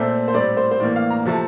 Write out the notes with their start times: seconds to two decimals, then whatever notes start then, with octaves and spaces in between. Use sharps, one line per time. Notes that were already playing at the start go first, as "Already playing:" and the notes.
Already playing: A#2 A3 C4 E5
0.28 C5
0.34 A2 G3 C4 D5
0.57 C5
0.71 C5
0.80 A2 E3 A#3 D5
0.96 F5
1.11 A#5
1.25 C3 F3 A3